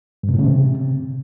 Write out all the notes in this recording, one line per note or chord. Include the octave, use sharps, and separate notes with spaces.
G2
C3
A2
C#3
C3